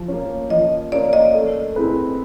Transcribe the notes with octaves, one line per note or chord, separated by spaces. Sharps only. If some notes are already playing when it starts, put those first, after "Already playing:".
Already playing: F3
A#3 C#4
F3 D#5
A#3 C#4 D5
D#5
A3
C4 E4 G#4 B4